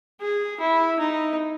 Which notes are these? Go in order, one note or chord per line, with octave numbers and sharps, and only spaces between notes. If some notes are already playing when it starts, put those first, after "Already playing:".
G#4
E4
D#4